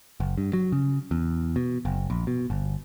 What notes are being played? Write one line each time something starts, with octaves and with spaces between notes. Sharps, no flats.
F#1
G2
F#3
C#3
E2
B2
F#1
A#1
B2
G1